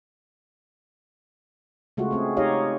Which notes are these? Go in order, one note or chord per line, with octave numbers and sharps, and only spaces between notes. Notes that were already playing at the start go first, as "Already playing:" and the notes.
C#3 G#3 A3 F4 F#4
G#3 C4 G#4
D#4 G4 C#5 D#5 F5